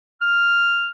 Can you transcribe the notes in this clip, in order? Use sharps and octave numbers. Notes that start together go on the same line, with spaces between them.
F6